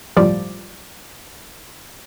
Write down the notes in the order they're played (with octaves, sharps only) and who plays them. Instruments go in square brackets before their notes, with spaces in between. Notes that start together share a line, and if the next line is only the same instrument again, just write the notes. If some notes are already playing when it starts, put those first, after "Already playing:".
[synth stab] G1 C#2 A2 F3 G3 D5